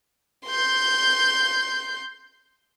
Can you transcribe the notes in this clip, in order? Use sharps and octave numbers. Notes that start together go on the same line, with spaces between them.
C6 G6